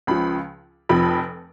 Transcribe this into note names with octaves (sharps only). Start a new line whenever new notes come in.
C#2 C#3 F3 B5
F1 F2 F3 B5